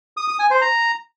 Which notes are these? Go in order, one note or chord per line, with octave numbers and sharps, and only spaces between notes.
D#6
D#6
G#5
C5
A#5